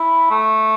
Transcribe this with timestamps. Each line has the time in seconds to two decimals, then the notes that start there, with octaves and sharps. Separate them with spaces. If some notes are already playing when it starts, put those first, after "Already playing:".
Already playing: E4
0.31 A3